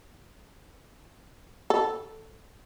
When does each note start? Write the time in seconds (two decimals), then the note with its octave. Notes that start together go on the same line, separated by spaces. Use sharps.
1.70 A4